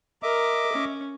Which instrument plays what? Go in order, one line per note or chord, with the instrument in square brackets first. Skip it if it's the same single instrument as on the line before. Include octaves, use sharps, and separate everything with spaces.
[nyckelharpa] A#4 [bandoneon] D#5 E5 D6
[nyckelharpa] C#4